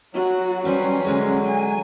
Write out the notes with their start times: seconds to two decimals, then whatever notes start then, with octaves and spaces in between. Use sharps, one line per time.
0.14 F#3 F#4
0.65 G3 C#4 B4 C5
1.04 D3 G#3 G#4
1.45 G#5